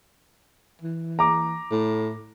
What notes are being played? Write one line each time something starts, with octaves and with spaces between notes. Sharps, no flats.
E3
A#5 D6
A2